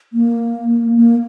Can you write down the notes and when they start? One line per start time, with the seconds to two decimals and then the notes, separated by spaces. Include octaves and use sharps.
0.13 A#3
0.96 A#3